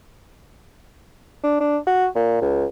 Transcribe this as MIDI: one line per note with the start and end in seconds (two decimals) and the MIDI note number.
1.43 1.59 62
1.60 1.77 62
1.87 2.07 66
2.16 2.39 46
2.41 2.65 37